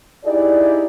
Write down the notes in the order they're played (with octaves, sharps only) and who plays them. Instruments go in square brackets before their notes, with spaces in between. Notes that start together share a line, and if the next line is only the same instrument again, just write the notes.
[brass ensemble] D#4 E4 G4 G#4 D5